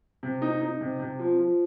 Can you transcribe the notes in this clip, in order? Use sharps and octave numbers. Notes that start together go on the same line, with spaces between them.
C3
D#4
D#4
C3
C3
F3
F3